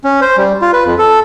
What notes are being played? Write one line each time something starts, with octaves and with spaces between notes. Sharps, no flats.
C#4
C5
G3
F4
B4
F2
A4